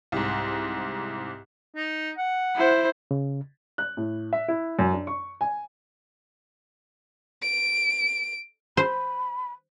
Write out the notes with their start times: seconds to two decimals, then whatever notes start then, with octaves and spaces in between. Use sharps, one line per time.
0.12 C2 G#2
1.76 D#4
2.18 F#5
2.55 E4 C5
3.11 C#3
3.78 F#6
3.97 A2
4.33 E5
4.48 E4
4.79 F#2
4.93 D4
5.07 C#6
5.41 G#5
7.43 D7
8.77 C5 B5